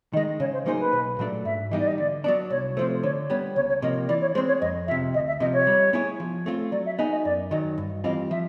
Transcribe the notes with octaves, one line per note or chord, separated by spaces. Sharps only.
D#3 G#3 D#5
C#3 C#5
C5
F#3 A#3 D#4 G#4 C5
B4
B1
A#2 F#3 A3 D4
G#2 E5
E3 G3 B3 D#4 D#5
D5
D#5
D3 D5
F#3 B3 D4 D5
C2 C#5
C3 F3 A3 C5
D3 C#5
G3 B3 C#5
C#2 C#5
C#5
C3 F3 A#3 D#5
E3 D5
C#5
G#3 C4 C5
C#5
F2 D#5
C3 F3 E5
D2 D#5
E5
C3 F3 D#5
C#5
G3
B3 E4 G#4 C#5
F3
A3 C4 F4
F#3 D5
E5
B3 D#4 G#4 D#5
D#5
F#2 D5
D#3 F#3 D#5
G2
E3 G3 C4 F4 D#5
F3 E5